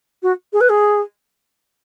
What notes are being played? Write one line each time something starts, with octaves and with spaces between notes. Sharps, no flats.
F#4
G#4
B4
G#4